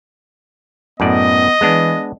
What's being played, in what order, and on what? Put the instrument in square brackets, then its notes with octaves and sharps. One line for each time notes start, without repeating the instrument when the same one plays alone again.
[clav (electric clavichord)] F#2 A2 D5 [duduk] B3 [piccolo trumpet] D#5
[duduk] E3 [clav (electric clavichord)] G#3 B3 D4